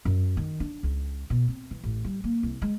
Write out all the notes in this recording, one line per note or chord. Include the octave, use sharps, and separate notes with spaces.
F#2
D#3
D4
C#2
B2
C4
E3
A1
G3
A#3
C2
G#3